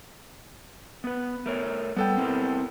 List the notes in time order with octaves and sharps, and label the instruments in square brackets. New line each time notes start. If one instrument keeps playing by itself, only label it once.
[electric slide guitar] B3 B4
A3 A#4 C#5
[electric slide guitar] G3 [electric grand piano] B3 A4 G5
[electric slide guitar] C4 E4 A#4